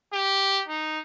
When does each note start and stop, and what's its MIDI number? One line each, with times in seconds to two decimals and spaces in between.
0.13 0.63 67
0.68 1.00 63